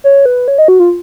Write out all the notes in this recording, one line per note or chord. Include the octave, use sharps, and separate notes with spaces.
C#5
B4
C#5
D#5
F#4
F4